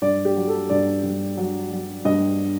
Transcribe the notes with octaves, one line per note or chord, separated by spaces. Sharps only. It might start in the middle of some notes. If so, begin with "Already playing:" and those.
G2 D5
G4
F#3
A4
G2 D5
G2
F#3
F#3
G2 D#5